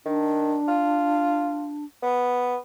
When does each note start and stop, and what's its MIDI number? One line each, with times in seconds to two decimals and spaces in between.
0.06 0.56 51
0.06 1.85 62
0.68 1.75 65
2.03 2.56 59